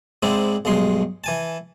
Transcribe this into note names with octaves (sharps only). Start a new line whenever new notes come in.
G#2 G#3 C4 D4 E4
B1 G2 G#3 C6
E3 G#5 A5